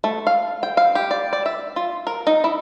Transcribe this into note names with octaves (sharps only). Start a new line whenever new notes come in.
A3
F5
G5
F5
G4
D5
D5
E5
F4
A#4
D#4
E4